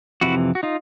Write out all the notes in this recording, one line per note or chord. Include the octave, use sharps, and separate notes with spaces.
F2 C3 E3 E4 F#4
F#4
D#4 F4